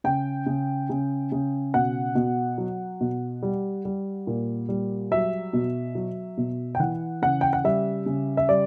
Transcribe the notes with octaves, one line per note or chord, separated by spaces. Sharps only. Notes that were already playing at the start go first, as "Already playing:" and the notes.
C#3 G5
C#3
C#3
C#3
B2 F#5
B2
F#3
B2
G3
G3
A#2
G3
F#3 E5
B2
F#3
B2
G5
E3 F#5
C#3 F#5
G5
F#5
G3 E5
C#3
E5
G3 D5